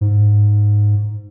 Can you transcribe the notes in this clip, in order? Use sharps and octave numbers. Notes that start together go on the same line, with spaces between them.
G#2